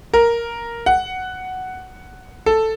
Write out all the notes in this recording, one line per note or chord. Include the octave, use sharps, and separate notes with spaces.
A#4
F#5
A4